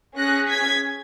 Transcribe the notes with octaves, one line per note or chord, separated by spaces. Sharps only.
C#4 G#4 F#6 A#6
G#6 B6